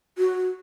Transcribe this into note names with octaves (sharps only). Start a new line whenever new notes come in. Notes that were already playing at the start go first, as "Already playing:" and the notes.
F#4